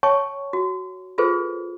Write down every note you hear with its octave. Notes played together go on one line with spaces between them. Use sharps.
C#5 G5 A5 C#6
F#4
F4 G#4 A4 B4 C5